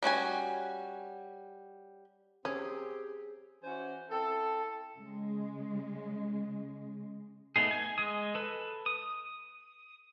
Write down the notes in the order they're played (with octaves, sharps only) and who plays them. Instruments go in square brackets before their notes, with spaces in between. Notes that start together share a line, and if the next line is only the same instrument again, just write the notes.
[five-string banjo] G3 C#4 F#4 G#5
[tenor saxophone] C4 [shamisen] C#4 [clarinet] G4 [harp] G#4
[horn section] E3 C#4 F#4 C5 G#5
C4 E4 A4
[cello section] C#3 G#3
[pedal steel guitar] A3 B3 D#4 G#4
G#5
G#3 D#6
A4 B4
D#6